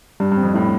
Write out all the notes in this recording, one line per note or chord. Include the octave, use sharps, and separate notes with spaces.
G2 G3
G2
C4
F2
A2 E4